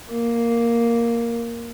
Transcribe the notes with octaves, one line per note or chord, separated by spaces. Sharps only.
A#3